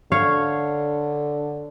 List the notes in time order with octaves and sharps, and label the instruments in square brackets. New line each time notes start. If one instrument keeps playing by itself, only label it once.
[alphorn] D3 [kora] C#5 F5